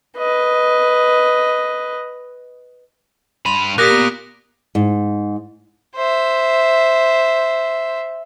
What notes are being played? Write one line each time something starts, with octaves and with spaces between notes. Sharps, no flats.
B4 D#5
G2 B5 C6 D#7 F7
A#2 G4 A#4 D6 D#6 F#6 A#6 B6
B3
G#2
C5 E5